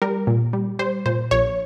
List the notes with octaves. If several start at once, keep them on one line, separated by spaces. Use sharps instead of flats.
G3 A#4
A#2
G3
G3 C5
A#2 C5
A#1 C#5